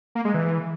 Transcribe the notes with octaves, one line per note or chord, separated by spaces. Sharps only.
A#3
G#3
E3